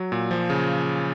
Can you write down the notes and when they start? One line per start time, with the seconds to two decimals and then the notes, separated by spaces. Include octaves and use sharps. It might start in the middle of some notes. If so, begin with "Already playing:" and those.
Already playing: F#3
0.12 A#2
0.31 F3
0.50 C#3